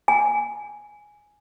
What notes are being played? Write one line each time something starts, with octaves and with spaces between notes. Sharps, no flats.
G#5